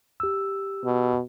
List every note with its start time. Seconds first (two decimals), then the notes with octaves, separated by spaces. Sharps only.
0.20 G4 E6
0.84 B2